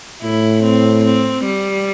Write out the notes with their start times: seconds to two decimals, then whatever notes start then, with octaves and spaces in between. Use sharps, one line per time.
0.22 A2 E4
0.63 C4
1.05 C4
1.45 G3